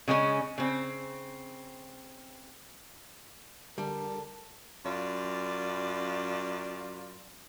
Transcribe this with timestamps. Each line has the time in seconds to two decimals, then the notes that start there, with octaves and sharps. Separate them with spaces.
0.08 C#3 G#3 C4 C#4
0.58 C#3 C4
3.78 D3 G3 A#4 A5
4.86 F#2 F4 D5